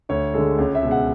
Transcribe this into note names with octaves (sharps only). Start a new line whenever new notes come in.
D2 C#5
D3 G#3 A4
C#2 C#5
E5
B2 G#3
F#5